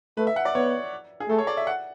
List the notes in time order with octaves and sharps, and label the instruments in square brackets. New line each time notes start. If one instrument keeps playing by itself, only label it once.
[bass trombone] A3 [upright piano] B4
[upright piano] E5
F#5
D5
[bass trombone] B3 [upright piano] C#5
[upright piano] G#4
[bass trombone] A3 [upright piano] A4
[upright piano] C#5
D5
E5
F#5